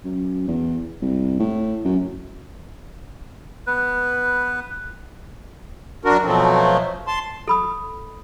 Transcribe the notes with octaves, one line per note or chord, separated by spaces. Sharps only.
F#2
E2
C2
A2
F#2
B3 B4
F#2 D4 F#4 A#4
B2 F3 F#3 A3 C4
A5 C6
A4 B5 D#6